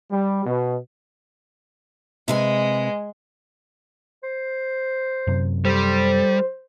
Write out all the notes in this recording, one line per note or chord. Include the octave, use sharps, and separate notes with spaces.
G3
B2
C3 G#3 B4 G#5
C5
F#2 C3
G3 A4 C5